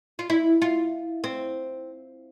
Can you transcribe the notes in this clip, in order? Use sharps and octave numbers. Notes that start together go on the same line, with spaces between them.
F4
E4
F4
C4